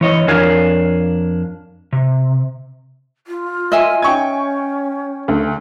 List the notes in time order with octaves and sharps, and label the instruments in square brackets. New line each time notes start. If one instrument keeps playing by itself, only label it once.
[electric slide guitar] E3 C#5 D#5
F2 D4 A#4 C#5 F5 G#5
C3
[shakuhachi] F4
[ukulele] D#5 E5 G#5
[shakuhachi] C#4 [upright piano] G5 C#6 G#6
[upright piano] D2